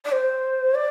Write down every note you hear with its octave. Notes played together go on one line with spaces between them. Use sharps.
D5
C5
D5